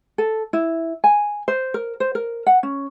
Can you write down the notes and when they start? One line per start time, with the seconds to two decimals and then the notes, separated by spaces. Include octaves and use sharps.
0.18 A4
0.53 E4
1.04 G#5
1.48 C5
1.74 A#4
2.00 C5
2.15 A#4
2.46 F#5
2.63 C#4